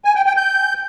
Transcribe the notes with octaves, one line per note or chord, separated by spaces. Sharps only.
G#5
G5
G5
G6